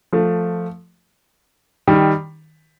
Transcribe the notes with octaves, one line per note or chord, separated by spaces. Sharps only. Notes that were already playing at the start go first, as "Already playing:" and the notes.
F3 A3
D#3 G3